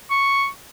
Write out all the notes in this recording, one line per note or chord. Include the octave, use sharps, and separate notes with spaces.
C#6